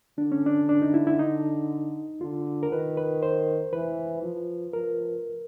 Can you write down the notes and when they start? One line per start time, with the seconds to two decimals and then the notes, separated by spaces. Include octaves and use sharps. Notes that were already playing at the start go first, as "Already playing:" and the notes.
0.18 D3 D4
0.32 C#4
0.46 D4
0.69 D4
0.82 D#4
0.94 E4
1.07 E4
1.19 D#4
2.21 D3 F4
2.63 A#4
2.71 D#3 B4
2.97 B4
3.23 C5
3.73 E3 B4
4.23 F3
4.73 F3 A#4